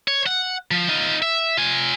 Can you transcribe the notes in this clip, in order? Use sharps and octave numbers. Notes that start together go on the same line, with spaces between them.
C#5
F#5
F3
D#4 F4
E5
F4 G#5